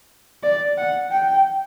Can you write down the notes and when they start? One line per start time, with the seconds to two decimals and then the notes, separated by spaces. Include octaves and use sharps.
0.43 D5
0.77 F#5
1.11 G5